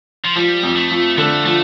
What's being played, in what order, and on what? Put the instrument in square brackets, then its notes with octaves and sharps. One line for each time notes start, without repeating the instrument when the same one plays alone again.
[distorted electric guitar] F3
[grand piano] F3 [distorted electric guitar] G3
[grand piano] F2
[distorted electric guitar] A3
[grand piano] F3
[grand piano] D3 [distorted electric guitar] A3
[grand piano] F3 [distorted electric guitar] A3